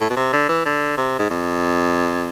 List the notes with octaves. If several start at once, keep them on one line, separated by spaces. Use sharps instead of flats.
A2
B2
C3
D3
E3
D3
C3
G#2
F2